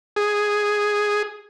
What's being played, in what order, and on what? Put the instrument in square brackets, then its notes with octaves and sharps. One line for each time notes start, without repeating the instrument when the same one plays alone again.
[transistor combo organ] G#4